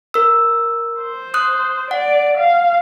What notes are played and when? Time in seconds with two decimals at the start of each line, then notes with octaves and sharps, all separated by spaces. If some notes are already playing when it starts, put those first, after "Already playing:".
0.14 A#4 E6
1.01 C5
1.34 D#6 F#6
1.91 D5 F#5
2.38 F5